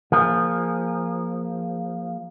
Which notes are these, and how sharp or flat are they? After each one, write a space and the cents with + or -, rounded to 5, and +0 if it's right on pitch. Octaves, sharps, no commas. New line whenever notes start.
F3 +0 A#3 +0 G#4 -20